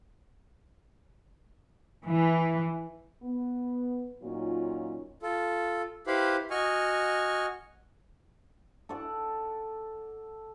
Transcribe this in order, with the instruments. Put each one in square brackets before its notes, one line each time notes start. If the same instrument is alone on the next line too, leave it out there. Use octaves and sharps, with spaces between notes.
[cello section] E3
[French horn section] B3
A#2 F#3 C#4 D#4 F4
[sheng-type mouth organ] F4 A4
E4 G4 B4 C5 F5 B5
F#4 D#5 G#5 C#6 F6
[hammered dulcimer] A4 D5 F#5